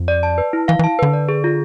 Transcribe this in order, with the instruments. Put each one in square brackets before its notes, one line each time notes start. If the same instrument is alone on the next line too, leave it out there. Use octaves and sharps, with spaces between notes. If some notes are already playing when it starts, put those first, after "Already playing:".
Already playing: [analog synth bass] F2
[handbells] D5
A5
B4
E4
[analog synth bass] E3 [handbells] F5
[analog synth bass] E3
[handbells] A5
[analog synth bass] D3 [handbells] B4
[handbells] D5
G#4
F4